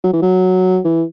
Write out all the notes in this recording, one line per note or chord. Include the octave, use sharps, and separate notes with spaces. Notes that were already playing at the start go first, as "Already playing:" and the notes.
F#3
E3
F#3
E3